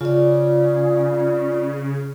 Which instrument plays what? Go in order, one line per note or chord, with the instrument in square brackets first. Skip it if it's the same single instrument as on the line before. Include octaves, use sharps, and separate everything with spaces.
[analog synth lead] C#3 [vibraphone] F4 D5